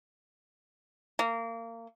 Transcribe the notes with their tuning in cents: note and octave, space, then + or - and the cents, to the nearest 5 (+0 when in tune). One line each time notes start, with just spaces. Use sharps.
A#3 -25